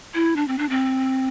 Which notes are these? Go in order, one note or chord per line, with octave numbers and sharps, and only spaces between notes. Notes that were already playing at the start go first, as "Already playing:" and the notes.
E4
D4
C4
D4
C4